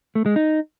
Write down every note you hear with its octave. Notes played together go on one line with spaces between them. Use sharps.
A3
G#3
D#4